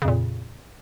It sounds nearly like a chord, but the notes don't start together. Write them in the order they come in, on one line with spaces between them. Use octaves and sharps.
C#3 F2 A#2